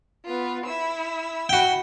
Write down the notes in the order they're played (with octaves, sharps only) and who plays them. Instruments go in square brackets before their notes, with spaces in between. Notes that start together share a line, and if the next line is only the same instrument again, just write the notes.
[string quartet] B3 F4
E4 E6
[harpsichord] F#4 G5